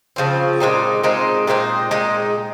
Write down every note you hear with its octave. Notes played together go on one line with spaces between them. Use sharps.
C#3 F3 C4
A#2 G#3 C4 D#4
A#2 G#3 C4 D#4
A#2 G#3 C4 D#4
A#2 G#3 C4 D#4